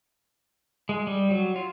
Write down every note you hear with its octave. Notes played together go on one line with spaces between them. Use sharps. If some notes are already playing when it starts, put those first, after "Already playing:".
G#3
G3
F#3
F4